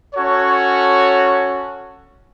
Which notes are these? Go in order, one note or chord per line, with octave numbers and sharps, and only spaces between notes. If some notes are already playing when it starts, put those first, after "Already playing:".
C#4 F#4 A4 C#5